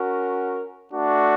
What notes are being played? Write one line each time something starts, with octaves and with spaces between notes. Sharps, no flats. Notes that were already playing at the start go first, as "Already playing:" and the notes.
Already playing: C#4 F#4 A#4
A3 D4 F#4